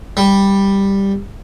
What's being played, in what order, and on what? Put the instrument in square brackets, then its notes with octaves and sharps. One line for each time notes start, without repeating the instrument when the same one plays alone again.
[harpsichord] G3